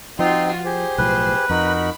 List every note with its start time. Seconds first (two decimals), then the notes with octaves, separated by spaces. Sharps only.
0.19 F3 C4 D#4 F4 F#4 C6
0.65 G4 G#4 C5
0.98 B1 A2 F3 B4
1.50 F2 D#4 F#4 A#4 B5